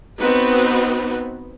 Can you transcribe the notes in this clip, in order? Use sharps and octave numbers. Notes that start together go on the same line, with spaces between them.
B3 C4 D#4 F#4 B4